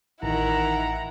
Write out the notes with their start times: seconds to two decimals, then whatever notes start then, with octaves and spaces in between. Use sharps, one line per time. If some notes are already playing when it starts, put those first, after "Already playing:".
0.23 A1 D#3 E4 F#5 A#5